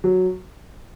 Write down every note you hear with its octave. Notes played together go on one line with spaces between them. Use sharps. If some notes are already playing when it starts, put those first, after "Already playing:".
F#3